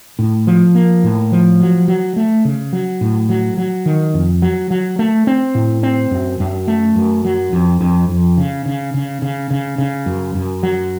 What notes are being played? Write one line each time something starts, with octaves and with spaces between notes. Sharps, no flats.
A2
F3
A#3
A2
F3
F#3
F#3
A3
C#3
F#3
A2
F#3
F#3
D#3
F2
F#3
F#3
A3
C4
A2
C4
F#2
F#2
A3
F#2
F#3
F2
F2
F2
C#3
C#3
C#3
C#3
C#3
C#3
F#2
F#2
F#3